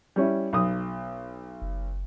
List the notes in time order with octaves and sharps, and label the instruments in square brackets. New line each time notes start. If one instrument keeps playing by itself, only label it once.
[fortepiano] G3 C#4 E4
B1 D#6
[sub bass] F#1